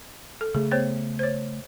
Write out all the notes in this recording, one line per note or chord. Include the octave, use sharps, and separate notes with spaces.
A4
C#3 A3 G#4
B3 C5 C#5
C5 C#5